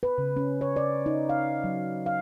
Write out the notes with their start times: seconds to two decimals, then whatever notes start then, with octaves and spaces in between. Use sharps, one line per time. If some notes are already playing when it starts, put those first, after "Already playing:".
0.03 B4
0.18 C#3
0.36 C#4
0.61 C#5
0.76 D5
1.06 D#4
1.29 F5
1.64 F#3
2.06 F5